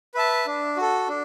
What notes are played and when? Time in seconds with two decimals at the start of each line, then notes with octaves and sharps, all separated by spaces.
0.14 B4 E5 A5
0.46 D4
0.77 F#4 A4
1.09 D4